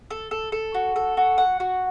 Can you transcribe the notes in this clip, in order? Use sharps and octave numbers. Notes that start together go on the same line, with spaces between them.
A4
A4
A4
F#4
A4
F#4
F#5
F#4